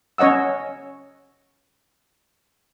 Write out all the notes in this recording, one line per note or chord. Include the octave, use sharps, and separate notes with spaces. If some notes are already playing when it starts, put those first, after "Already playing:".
C#4 C#5 D#5 F#5 E6